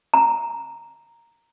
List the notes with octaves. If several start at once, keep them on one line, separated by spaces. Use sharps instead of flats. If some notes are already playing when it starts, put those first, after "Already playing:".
A#5